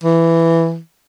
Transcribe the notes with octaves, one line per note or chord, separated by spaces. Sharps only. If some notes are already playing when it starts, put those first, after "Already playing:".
E3